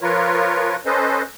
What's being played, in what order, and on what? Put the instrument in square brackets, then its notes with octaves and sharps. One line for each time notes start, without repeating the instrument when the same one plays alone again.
[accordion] F3 F4 A#4 B4 C#5
C#4 A4 B4 C5 D#5